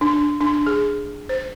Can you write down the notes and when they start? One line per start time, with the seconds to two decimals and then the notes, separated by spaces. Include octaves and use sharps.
0.01 D4
0.41 D4
0.66 G#4
1.29 C5